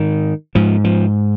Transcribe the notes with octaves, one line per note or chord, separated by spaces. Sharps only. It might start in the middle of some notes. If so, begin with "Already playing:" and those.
Already playing: G#2 D#3
G#2 F3
F3